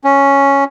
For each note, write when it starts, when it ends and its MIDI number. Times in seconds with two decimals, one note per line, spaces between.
0.04 0.64 61